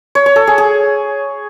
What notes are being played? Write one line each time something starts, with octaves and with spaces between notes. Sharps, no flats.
C#5
C#5
A4
G#4
G#4